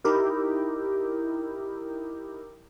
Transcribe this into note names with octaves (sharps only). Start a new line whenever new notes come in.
D#4 E4 G4 A#4